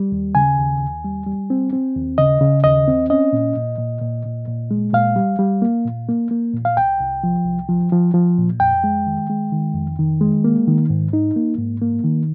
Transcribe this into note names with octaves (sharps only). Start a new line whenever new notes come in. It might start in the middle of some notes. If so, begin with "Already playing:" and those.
Already playing: G3
D#2
C#3 G#5
D#2
D#2
G3
G3
C4
C4
D#2
C#3 D#5
C#3
D#2 D#5
C4
C#4 D#5
A#2
A#2
A#2
A#2
A#2
A#2
G#3
A#2 F5
G3
G3
A#3
A#2
A#3
A#3
A#2
F5
C2 G5
C2
F3
C2
F3
F3
F3
A#2
F2 G5
G#3
D#3
G#3
D#3
F2
D#3
G#3
A#3
D#3
G#2
D#4
A#3
G#2
A#3
D#3